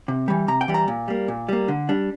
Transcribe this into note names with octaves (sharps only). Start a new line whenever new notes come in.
C3
E3 G3
C3 A#5
G5
E3 G3
A#5
A#2
G3 A#3
A#2
G3 A#3
D3
G3 D4